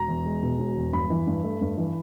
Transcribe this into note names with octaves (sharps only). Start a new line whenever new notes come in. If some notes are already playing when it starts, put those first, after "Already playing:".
Already playing: E1 A#5
E2
G#3
B2
E1
E2
G2 B5
E3
G2
A3
G2
E3